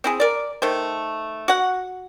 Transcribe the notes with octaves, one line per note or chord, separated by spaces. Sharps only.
C4 E4 G#4
A#4 D5
D#3 A3 C5
F#4 F#5